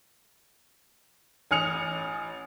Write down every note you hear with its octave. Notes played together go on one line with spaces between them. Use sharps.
A1 G#5 D#6 F6 C#7 F7